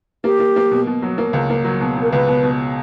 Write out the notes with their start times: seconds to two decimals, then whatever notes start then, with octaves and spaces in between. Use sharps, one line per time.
0.24 A#3 G4
0.40 A#3
0.56 A#3
0.71 B2
0.87 B2
1.02 F#3
1.18 A#3
1.33 C#2
1.50 A#3
1.64 F#3
1.81 B2
1.97 B2 A#4
2.12 C#2 B4
2.27 B2
2.43 B2